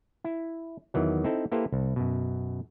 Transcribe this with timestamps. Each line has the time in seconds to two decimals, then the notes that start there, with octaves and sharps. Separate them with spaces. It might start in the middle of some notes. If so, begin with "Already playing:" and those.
0.24 E4
0.94 E2 D#3 E3 F#3
1.24 C4 D#4 E4 A4
1.52 A#3 E4 G4 A4 B4 C5
1.72 C2
1.96 F#2 B2